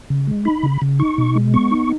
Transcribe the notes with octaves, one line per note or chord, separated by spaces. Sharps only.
C#3
G#3
D#4 B5
C#3
C#3
D#4 C#6
B2
G#3
B3 C#6
D#4